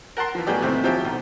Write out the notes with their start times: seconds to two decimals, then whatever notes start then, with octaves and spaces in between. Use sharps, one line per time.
0.17 A#4 F#5 A5 C6
0.35 E3 F3
0.47 A2 F#3 B3 C#4 G4 D5
0.62 D#2 A2 C3 E3 A3 C4
0.84 F3 F#3 C4 C#4 E4 G4
1.04 B1